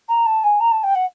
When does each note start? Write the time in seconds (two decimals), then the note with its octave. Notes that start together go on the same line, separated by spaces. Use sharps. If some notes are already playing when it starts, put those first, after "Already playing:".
0.08 A#5
0.26 A5
0.44 G#5
0.60 A#5
0.71 A5
0.83 G5
0.95 F#5